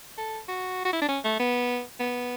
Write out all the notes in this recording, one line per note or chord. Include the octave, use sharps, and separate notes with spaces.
A4
F#4
F#4
E4
D4
C#4
A3
B3
B3